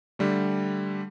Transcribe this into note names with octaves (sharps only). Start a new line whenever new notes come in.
D3 G3 A3